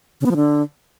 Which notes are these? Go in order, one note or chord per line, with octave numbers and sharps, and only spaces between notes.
C#3
B3
F3
D3